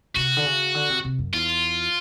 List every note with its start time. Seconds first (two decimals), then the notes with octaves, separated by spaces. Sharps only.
0.16 C3 F#4
0.37 D3
0.46 C#3
0.74 D3
0.90 C3
1.04 C3
1.19 F#2
1.33 E2 F4